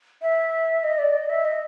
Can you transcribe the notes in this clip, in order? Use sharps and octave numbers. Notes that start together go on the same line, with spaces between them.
E5
D#5
D5
D#5
E5
D#5